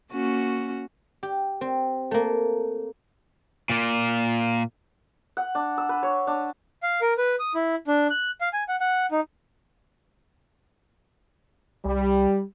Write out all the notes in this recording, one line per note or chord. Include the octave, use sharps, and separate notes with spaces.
A#3 C#4 F#4
G4
C4
A3 A#3
A#2 A#3
F#5
D4
E6
B4
C#5
D4
F5
A#4
B4
D#6
E4
D4
F#6
F5
G#5
F#5
F#5
D#4
C2 G3